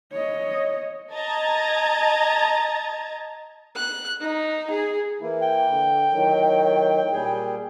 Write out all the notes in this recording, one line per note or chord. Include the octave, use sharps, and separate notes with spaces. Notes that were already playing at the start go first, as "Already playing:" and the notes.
C#5 D#5
D#5 A5 A#5 G#6 A6
F#6
D#4
G#4
E3 A#3 E4
G5
D3
A2 D#3 F#3
A#2 G3 G#4